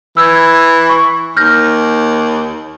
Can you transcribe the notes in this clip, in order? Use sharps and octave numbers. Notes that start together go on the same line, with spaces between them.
E3 E6 G6 G#6
C#6
D#2 F6 G6 A#6